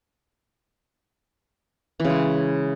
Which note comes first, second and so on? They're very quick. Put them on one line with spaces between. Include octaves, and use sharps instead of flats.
E3 C#3 G#3